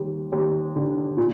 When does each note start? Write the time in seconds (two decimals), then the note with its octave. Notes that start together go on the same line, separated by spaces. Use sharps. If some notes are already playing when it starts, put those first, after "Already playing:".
Already playing: D#2 G3
0.32 D#2
0.76 D3
1.17 A#2